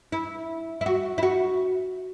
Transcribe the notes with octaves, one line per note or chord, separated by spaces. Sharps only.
E4
E4
F#4
E4
F#4